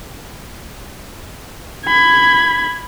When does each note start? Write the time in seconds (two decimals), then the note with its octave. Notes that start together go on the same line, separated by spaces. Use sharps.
1.85 B5 G#6